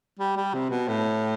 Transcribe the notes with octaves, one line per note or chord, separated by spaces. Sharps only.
G3
G3
C3
B2
A2